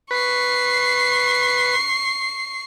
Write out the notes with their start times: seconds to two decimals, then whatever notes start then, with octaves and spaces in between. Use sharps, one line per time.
0.11 B4 C#6 C7